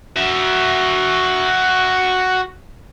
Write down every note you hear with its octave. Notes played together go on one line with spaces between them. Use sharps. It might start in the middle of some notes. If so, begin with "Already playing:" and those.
F#4 E5